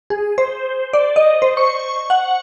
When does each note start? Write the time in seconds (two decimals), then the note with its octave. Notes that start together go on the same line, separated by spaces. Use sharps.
0.10 G#4
0.38 C5
0.93 D5
1.16 D#5
1.42 C5
1.57 C#6
2.10 F#5